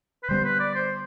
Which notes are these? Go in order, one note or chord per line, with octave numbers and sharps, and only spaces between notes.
B4
D3 G3 B3 C5
B4
D5
C5